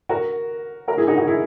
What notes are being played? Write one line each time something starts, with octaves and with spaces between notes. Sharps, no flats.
F#4 A#4
F#4 A#4
E4 G#4
D#4 F#4
D#4 F#4
E4 G#4